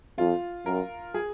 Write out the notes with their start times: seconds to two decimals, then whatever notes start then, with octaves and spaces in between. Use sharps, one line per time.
0.18 F2 F4
0.66 F#2 A#4
1.14 G#4